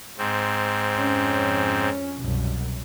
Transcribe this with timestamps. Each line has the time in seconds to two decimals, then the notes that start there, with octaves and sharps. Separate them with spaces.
0.18 G#2 C4
0.95 F2 C#4
2.16 C2 F#2 B2